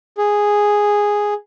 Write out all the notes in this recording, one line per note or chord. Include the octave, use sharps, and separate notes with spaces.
G#4